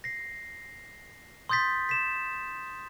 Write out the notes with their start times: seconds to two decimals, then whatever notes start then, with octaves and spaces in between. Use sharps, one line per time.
0.04 A#6 C7
1.49 C6 D#6 G6 A6 B6
1.89 B6 E7